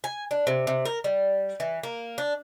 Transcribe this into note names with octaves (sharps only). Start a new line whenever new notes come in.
G#5
D4
C3
C3
A#4
G3
E3
A#3
D4